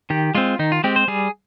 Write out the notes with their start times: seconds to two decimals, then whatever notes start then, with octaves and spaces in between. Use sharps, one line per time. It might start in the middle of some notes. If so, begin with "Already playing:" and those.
0.10 D#3 G4
0.35 G#3 C4 F4
0.59 D#3 D#4
0.72 F4
0.84 G#3 C4 G4
0.96 C5
1.08 G3 G#4